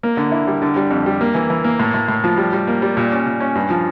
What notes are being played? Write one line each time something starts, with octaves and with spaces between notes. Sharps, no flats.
A#3
D3
E4
G3
D3
G3
F2
G3
A#3
E3
E3
A#3
A2
A2
A2
F3
G3
G3
A#3
G3
A#2
C#4
A#2
C#4
G2
F3